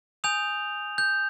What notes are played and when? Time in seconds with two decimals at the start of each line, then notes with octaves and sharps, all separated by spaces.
0.24 G#5 D#6 G6 F7
0.98 G6